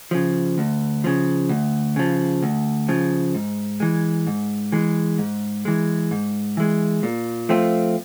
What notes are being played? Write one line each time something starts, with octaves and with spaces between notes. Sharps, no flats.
C#3 F3
D2
C#3 F3
D2
C#3 F3
D2
C#3 F3
G#2
E3 G#3
G#2
E3 G#3
G#2
E3 G#3
G#2
E3 G#3
A#2
F3 A3 C4 F4